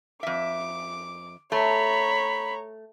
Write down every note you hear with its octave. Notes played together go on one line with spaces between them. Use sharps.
F2 E5 D6
A3 C#5 A#5 B5